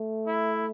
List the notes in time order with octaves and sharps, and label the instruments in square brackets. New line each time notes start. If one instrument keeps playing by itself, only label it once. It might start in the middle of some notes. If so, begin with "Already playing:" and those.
Already playing: [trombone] A3
[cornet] E4